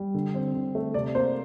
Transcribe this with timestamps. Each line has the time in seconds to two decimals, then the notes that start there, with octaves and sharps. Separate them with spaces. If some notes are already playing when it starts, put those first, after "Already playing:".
Already playing: G3
0.14 D3
0.34 C4
0.55 D3
0.75 A3
0.94 C3 D5
1.15 A#3 C5